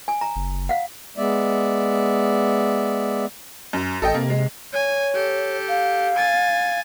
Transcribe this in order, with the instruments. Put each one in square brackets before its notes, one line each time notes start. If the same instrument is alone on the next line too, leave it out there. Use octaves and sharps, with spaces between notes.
[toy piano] G#5
A#5
[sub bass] F#1
[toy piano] F5 F#5
[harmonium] G#3 B3 D5 E5
[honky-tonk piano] F#2
[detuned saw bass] A1 [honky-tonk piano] A4 D#5 G5
[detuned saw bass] C3 [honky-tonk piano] A#3
[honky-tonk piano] G#3
[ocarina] C#5 [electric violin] G#5
[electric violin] G4 A4
[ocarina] F5
[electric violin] G#5 A6